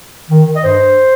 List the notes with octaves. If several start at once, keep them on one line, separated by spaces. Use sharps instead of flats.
D#3
D#5
G2 C5